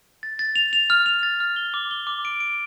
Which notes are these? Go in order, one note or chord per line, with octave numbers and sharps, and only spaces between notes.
A6
A6
F7
F7
F6
F7
A6
F6
G7
D6
G7
D6
D7
D7